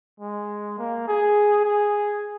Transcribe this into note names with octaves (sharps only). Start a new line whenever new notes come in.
G#3
A#3
G#4
G#4